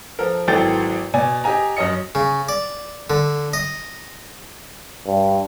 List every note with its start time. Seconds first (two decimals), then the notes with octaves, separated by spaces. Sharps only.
0.19 F3 A4 A#4
0.48 G#1 E3 F#3 A4 G5 A6
1.14 B2 D5 G#5
1.44 G4 D#5 G#5 A#5
1.77 F#2 C#5 D#5 C#7
2.15 C#3
2.49 D5
3.10 D3
3.53 D#5
5.06 G2